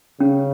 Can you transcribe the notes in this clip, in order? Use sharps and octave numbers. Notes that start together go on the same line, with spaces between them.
C#3 C#4